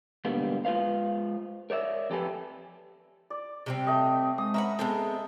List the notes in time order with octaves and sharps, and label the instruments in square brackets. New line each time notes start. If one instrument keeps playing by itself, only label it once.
[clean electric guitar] G#2 B2 D3 G3 A#3 B3
G#3 F4 B4 C5 F5
A#4 C#5 D5 E5
F2 G4 A4 B4 G#5
[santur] D5
[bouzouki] C3 G3 C4
[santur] A3 D#5
[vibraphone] G#3 [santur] D#6
[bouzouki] C#4 B4 F#5 [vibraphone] E5 [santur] A#5
[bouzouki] G#3 B3 C4 [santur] A4